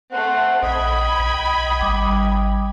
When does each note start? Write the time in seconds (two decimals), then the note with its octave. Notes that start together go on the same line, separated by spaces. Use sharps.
0.12 A3 C4 F#5
0.63 A#1 D#5 G5 B5 G#6
1.20 B1
1.81 G#1 G3 D6